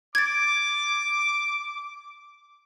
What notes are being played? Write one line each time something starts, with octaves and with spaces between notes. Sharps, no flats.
D6 G#6 A6